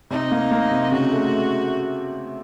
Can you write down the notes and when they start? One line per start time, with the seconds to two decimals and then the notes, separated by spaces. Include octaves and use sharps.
0.11 C3 D#4
0.31 A#3
0.51 A#3
0.71 C3
0.92 C#3 F#4
1.11 A3